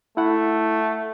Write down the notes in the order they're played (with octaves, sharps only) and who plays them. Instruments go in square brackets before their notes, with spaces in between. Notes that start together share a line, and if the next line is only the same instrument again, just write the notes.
[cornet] A3 [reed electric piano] E4 F#5